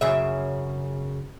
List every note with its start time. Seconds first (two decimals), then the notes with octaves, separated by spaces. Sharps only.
0.01 F#2 C#3 E5